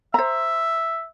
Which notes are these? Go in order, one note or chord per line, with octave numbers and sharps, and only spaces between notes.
C5 E5 A#5